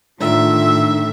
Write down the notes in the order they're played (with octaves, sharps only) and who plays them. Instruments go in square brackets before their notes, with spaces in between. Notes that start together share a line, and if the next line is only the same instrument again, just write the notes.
[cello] A2 [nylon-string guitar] D3 D#3 D4 [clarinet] F4 [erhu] E5